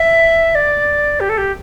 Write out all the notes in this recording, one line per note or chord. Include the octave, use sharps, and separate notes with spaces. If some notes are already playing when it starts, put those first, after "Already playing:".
Already playing: E5
D5
G4
A4
G4